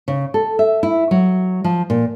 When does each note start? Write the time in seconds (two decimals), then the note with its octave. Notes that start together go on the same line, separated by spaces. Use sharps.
0.08 C#3
0.34 A4
0.59 E5
0.83 E4
1.11 F#3
1.64 F3
1.90 A#2